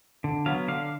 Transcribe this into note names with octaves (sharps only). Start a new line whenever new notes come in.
D3
F#3 B3 F5
D3 F5